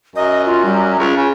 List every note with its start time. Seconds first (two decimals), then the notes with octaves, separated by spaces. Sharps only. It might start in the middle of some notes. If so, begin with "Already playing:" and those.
0.16 F#2 D#5
0.46 F4
0.65 G3
0.99 C#2 F4
1.16 C#3